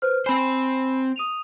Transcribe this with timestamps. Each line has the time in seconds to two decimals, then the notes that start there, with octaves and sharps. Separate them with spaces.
0.02 B4 C5 F6
0.26 C4 C5 G#5 B5
1.16 D#6 D#7 F7